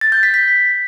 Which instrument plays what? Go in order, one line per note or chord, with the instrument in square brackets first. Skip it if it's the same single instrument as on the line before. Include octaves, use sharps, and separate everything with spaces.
[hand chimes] A6
G6
B6
B6